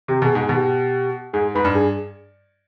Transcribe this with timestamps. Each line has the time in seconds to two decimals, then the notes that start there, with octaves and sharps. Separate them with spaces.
0.08 C3 G4
0.22 B2 G#4
0.35 G#2 G#4
0.49 B2
0.56 G4
1.33 G#2 G#4
1.55 G#2 B4
1.65 G2
1.75 G#4